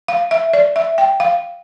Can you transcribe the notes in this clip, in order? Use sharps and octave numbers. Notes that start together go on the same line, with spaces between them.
F5
E5
D5
E5
G5
F5